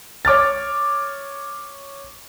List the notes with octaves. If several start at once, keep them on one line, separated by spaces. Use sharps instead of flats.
C#5 D6 F6 A6